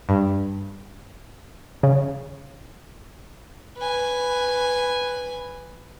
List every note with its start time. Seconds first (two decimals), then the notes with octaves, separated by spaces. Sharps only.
0.09 G2
1.83 C#3
3.78 B4 G#5